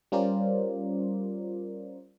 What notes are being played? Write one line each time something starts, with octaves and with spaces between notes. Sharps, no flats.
G3 C#4 F4 A#4 C5 D5